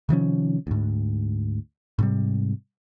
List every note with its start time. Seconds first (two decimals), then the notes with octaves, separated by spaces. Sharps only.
0.09 C3 D#3 F3 C#4
0.67 D2 G#2
1.99 G#2 C3 G3